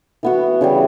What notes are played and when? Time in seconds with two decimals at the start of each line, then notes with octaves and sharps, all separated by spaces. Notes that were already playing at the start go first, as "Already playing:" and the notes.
0.23 E3 B3 F#4
0.61 C#3 E3 G3